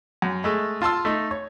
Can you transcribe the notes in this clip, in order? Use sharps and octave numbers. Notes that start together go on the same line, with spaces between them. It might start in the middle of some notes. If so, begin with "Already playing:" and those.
F#2
G#3 A3
F4 A5 C6 E6
A3 D#4
C#5